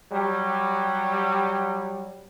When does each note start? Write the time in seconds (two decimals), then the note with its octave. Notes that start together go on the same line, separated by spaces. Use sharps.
0.12 F#3 G3